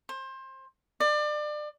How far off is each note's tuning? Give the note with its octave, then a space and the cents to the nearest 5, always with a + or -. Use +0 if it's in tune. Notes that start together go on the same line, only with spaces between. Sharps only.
C5 +25
D5 +30